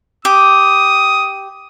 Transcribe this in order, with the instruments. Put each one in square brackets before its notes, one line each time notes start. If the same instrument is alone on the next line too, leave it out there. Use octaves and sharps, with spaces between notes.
[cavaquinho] G4 [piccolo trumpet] D#6